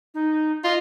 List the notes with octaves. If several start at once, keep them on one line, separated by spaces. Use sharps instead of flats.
D#4
F4 D#5